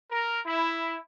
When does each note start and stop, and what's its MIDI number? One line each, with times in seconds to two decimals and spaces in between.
0.11 0.40 70
0.46 1.00 64